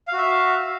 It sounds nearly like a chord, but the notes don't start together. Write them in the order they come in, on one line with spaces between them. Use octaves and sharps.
F5 F#4 E5